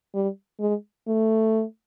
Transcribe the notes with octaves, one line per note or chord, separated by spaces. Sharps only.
G3
G#3
A3